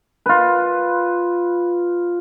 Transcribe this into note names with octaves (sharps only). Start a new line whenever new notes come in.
F4 B4